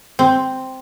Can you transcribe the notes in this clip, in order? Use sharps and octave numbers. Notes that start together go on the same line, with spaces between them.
C4